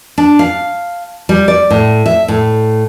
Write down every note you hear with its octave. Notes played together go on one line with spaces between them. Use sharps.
D4
F5
G3
D5
A2
E5
A2